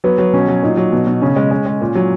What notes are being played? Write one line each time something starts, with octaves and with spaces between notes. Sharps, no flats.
F#3 B3
F#3
B2 C#4
F#3
A#2 D#4
F#3
B2
B2
C#3 C#4
G#3
G#3
G#3
A#2
F#3